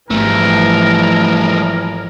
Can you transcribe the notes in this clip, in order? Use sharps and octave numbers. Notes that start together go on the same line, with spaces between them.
G#1 E3 F3 G3 A3 A#4